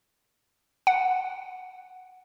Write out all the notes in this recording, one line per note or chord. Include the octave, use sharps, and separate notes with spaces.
F#5